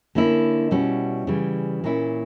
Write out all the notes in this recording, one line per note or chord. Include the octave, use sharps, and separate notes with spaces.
D3 A#3 C#4 E4
B2 G3 C#4 E4
C#3 E3 G3
A#2 A#3 C#4 E4